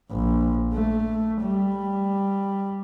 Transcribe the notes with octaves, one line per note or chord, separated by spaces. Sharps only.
A#1
A3
G3